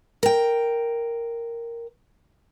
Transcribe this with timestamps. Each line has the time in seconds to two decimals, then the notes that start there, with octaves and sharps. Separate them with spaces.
0.23 A#4 G5